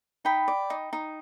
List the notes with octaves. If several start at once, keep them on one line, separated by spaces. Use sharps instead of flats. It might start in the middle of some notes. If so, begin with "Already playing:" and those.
D#4 G5 B5
D5
D#4
D#4